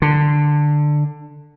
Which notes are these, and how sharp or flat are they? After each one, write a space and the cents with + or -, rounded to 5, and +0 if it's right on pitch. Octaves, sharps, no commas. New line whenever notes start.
D3 +10